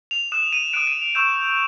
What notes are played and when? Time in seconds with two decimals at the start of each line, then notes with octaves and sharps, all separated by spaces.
0.11 F7
0.32 D#6 F#6 E7
0.53 D#7
0.73 D#6 F#6 D7
0.87 D#7
1.02 F7
1.15 C#6 E6 G6 E7